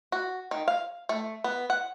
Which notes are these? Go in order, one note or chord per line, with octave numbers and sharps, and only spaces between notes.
F#4
D#3
F5
A3
B3
F#5